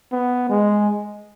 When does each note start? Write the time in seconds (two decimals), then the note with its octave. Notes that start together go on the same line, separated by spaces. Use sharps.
0.12 B3
0.49 G#3